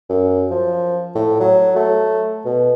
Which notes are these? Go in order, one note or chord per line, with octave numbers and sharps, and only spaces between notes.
F#2
F3
A2
F#3
A3
B2